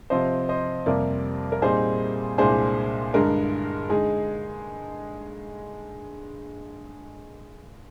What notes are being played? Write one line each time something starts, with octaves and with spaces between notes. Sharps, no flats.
C3 F3 C4 C5 D#5
C5 D#5
F2 C3 G3 A#3 A#4 D5
A#4
A#2 G3 C4 D#4 G#4 C5
C2 A#2 G#3 D4 G#4 C5
G2 D3 G#3 A#4
D3 G#3 D#4 G#4